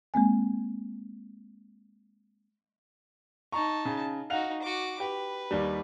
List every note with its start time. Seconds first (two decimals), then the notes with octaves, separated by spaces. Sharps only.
0.14 G#3 A#3 C4 G#5
3.52 D#4 A5 A#5 C#6
3.85 C#3
4.30 D#4 F#4 F5 F#5 F7
4.62 F#4 D6
5.00 G4 B4
5.51 D#2 G3